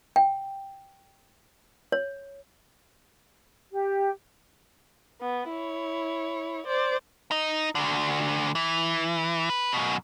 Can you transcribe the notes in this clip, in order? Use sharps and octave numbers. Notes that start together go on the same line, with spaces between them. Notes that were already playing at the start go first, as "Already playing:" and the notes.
G5
C#5
G4
B3
E4 C#5
C5 D5
D#4
D2 D3
E3
B4
F#2 B2